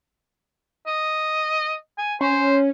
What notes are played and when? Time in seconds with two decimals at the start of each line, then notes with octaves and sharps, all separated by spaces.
0.87 D#5
1.98 G#5
2.21 C#4 C5